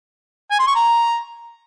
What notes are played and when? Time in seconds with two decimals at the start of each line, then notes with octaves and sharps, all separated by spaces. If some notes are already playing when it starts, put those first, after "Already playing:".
0.51 G#5
0.59 C6
0.67 C#6
0.76 A#5